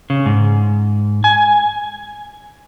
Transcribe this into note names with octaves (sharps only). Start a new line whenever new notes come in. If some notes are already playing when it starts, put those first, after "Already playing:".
C#3
G#2
G#5